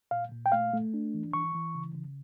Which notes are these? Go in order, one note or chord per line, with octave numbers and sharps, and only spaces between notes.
A#2 F5
A#2
G5
A3 F5
A3
D4
E3
E3 C#6
E3
C#3
C#3